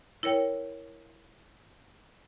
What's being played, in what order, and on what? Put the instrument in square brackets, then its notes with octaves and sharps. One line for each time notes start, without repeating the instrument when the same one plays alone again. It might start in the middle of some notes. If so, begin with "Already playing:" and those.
[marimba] E4 A#4 C#5 G5